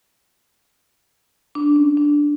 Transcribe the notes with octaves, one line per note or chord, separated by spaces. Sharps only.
D4
C#4
D4